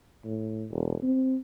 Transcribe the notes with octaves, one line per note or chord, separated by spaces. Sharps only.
A2
E1
C4